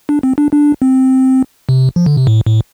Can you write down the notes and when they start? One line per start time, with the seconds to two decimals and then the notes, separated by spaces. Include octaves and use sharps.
0.09 D4
0.23 C4
0.38 D4
0.53 D4
0.82 C4
1.69 C3
1.96 F3
2.06 D3
2.17 C3
2.27 A2
2.47 A2